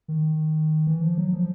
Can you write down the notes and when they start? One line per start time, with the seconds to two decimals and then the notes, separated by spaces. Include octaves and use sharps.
0.08 D#3
0.87 E3
1.02 F3
1.18 F#3
1.33 F3